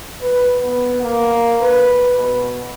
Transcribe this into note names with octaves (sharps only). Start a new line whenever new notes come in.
B4
B3
A#3
B4
B2